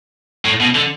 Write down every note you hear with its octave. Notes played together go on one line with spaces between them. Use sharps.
A2
B2
D3